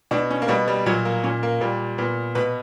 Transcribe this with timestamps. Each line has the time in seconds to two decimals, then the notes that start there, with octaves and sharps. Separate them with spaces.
0.11 B2 D4
0.31 C#4
0.42 A#3
0.48 B2 G3
0.68 G3
0.86 A#2 F#3
1.05 A#3
1.24 A#2 C#4
1.43 A#3
1.61 A#2 G3
1.98 A#2 B3
2.35 B2 B4